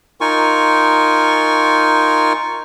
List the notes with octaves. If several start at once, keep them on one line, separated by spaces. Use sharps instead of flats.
D#4 F4 A#4 G#5 C#6